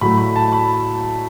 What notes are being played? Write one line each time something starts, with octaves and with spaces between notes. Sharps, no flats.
A2 F#3 A3 B5
B5
A5
B5